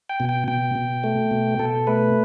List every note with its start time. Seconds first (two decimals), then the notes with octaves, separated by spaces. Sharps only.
0.09 G5
0.20 B2
0.29 G5
0.48 B2 G5
0.75 B2
1.04 A3
1.31 B2
1.59 B2 A4
1.87 A3 B4